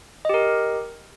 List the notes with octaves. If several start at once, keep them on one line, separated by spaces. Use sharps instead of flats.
G4 A#4 D#5